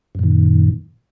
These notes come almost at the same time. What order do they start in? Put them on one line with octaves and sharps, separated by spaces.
F#2 A#2 D#3